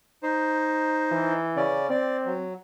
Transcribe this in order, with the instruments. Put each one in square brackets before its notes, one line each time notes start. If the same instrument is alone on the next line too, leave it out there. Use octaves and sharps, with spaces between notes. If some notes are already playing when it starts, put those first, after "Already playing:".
[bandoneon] D#4 C5
[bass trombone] E3
[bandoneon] C#3 C#4 D5
[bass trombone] C4 [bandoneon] D5
[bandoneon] F#3